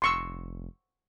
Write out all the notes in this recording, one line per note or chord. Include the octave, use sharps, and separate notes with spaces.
F1 C6 C#6 E6